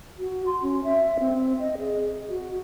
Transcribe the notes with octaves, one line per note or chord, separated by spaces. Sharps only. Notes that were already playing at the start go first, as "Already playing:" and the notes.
F#4
C6
C#4
E5
C4
D#5
G#4
F#4